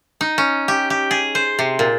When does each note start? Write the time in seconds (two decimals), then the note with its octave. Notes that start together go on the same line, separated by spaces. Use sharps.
0.21 D#4
0.38 C#4
0.68 G4
0.90 G4
1.11 G#4
1.35 C5
1.59 C3
1.79 A#2